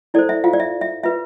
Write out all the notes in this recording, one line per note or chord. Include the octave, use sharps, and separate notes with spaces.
E4 A4 C5 D5
E5
F4 F5
D5
E5
E5
F4 B4 E5